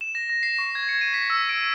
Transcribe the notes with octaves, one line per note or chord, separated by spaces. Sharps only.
E7
A#6
A#6
C7
C#6
G#6
C#7
D#7
B6
E6
D7
D#7